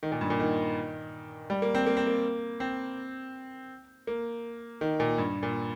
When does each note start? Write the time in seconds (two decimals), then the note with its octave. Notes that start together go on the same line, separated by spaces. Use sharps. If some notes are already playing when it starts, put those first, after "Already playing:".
0.03 D#3
0.12 A#2
0.21 G2
0.30 A#2
0.40 D#3
1.50 G3
1.62 A#3
1.75 C4
1.87 A#3
1.97 C4
2.07 A#3
2.60 C4
4.07 A#3
4.81 D#3
5.00 A#2
5.18 G2
5.43 A#2